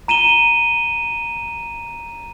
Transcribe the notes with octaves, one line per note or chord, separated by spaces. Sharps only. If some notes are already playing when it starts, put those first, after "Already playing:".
A#5 D#7 E7 G7